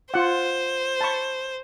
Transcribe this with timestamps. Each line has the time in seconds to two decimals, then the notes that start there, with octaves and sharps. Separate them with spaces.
0.14 F4 C5 F#5
1.01 A5 B5 C#6